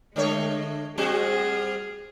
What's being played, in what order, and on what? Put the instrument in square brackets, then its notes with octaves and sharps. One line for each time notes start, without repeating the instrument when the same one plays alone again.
[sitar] D3 A3 C#5 [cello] G#3
[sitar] G3 C4 F#4 [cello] G#4